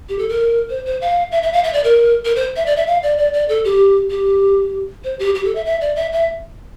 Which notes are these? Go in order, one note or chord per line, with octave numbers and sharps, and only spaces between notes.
G4
A4
A#4
C5
C5
F5
E5
E5
F5
E5
D5
A#4
A#4
C5
E5
D5
E5
F5
D5
D5
D5
A4
G4
G4
C5
G4
G4
A4
E5
E5
D5
E5
E5